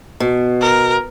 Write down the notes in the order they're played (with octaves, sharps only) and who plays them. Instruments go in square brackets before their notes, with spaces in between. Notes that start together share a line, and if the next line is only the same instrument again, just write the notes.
[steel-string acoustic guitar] B2
[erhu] A#4